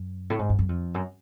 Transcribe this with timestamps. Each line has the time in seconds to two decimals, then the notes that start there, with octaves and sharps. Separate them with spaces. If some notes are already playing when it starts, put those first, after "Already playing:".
Already playing: F#2
0.30 A2
0.39 G#2
0.49 G2
0.59 F#2
0.69 F2
0.94 F#2